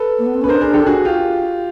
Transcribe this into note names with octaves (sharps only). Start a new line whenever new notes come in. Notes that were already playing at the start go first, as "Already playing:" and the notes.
Already playing: A4 B4
A#3
B3
C4
C#4 B4
D4 A#4 C5
G#4 A#4
G4 A4
F#4 G#4
F4 G4